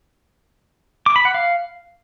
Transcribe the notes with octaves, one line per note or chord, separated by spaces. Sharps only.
D6
B5
F#5
F5